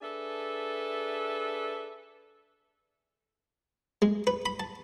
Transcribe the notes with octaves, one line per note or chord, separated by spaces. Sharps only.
D4 G#4 A4 B4 E5
G#3
B4
B5
A5